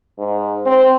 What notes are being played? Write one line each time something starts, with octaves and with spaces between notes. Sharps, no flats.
G#2
C4